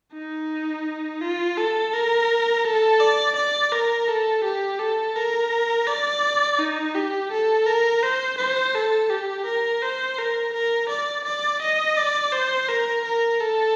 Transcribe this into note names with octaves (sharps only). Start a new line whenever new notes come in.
D#4
F4
A4
A#4
A4
D5
D5
A#4
A4
G4
A4
A#4
D5
D#4
G4
A4
A#4
C5
C5
A4
G4
A#4
C5
A#4
A#4
D5
D5
D#5
D5
C5
A#4
A#4
A4